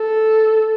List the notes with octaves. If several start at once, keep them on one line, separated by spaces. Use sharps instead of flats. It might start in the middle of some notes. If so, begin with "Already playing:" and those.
Already playing: A4